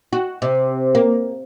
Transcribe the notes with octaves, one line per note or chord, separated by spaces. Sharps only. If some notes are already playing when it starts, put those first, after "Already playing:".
F#4
C3
A#3